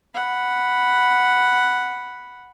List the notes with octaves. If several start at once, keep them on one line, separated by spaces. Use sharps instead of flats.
F#5 B5